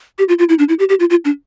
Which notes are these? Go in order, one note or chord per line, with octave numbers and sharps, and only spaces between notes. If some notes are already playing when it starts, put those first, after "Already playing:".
G4
F4
F4
E4
D4
E4
G4
G4
F4
F4
D4